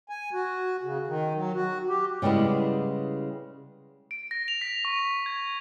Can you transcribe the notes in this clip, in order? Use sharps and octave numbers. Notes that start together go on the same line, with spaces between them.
G#5
F#4
C#3
D#3
F#3
F#4
G4
C#3 G3 G#3 B3 E4
D7
A#6
F7
B6
C#6
C#6
G#6